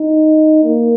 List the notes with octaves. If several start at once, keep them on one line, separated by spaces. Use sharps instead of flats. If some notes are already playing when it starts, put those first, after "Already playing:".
Already playing: D#4
A#3